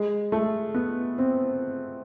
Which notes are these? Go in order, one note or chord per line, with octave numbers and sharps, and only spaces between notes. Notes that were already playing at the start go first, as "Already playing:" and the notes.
Already playing: G#3
A3
B3
C4